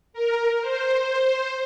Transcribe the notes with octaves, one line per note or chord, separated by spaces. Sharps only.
A#4
C5